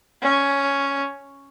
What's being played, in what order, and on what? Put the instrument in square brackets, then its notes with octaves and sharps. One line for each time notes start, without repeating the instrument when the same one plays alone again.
[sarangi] C#4